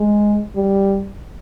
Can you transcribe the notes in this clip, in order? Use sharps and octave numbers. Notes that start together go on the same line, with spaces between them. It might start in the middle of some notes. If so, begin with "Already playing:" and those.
Already playing: G#3
G3